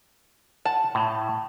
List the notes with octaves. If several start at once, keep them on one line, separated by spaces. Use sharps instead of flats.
F#5 A5
A2